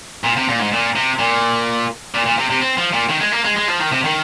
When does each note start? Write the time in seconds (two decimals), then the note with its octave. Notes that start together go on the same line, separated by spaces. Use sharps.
0.25 A#2
0.37 C3
0.49 A#2
0.60 G#2
0.73 A#2
0.96 C3
1.19 A#2
2.14 A#2
2.26 A#2
2.38 C3
2.50 C3
2.61 C4
2.78 F3
2.93 A#2
3.09 D#3
3.21 G#3
3.33 A#3
3.45 G#3
3.57 G#3
3.68 F3
3.80 D#3
3.92 C3
4.04 D#3